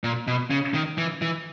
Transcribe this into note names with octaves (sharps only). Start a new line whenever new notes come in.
A#2
B2
C#3
D#3
E3
E3